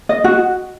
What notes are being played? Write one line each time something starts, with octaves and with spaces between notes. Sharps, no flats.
D#5
F#4